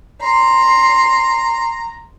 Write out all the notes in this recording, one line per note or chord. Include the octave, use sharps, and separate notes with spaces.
A#5 C6